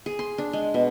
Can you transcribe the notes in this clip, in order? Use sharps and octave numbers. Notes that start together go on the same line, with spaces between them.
G#4
C6
D4
G#3
B2